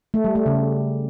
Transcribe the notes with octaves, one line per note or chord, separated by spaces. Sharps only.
A3
G3
A3
C#3